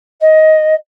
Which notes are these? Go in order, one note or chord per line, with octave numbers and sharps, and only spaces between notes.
D#5